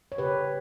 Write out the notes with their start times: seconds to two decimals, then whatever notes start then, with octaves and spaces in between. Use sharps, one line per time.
0.12 C#5
0.18 C#3 G4 B4